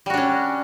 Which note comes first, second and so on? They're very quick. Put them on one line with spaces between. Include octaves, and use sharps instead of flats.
G3 F#4 D4 C#4